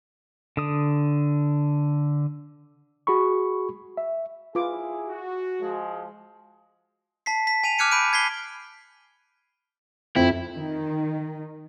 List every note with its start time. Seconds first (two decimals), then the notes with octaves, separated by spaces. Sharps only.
0.57 D3 D#6
3.07 F#4 G#4 B5 C#6
3.97 E5
4.55 E4 F4 G#4 B4 D6
5.08 F#4
5.61 F3 G#3
7.26 A5 B6 C7
7.47 B6
7.64 G#5 D#7 F7
7.78 D6 F6 F#6 G#6 C#7 D#7
7.91 B5 G6 D7 D#7
8.13 G#6 B6 C7 G7
10.16 F2 C4 E4
10.56 D#3